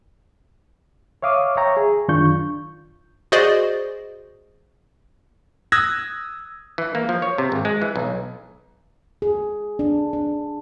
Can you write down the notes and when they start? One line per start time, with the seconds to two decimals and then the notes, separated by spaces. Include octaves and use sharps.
1.22 C#5 E5 F5 D6 D#6
1.57 C#5 E5 G5 A#5
1.77 G#4
2.08 F#2 D#3 D4 F4 C#6 G6
3.32 F#4 G#4 C5 D5 D#5
5.72 D#6 E6 F#6 G#6 A#6
6.78 E3
6.95 A#3
7.09 F3
7.22 C#5
7.38 C3
7.52 G#1
7.65 G#3
7.82 E3
7.96 B1
9.22 G#4
9.79 D4
10.13 D4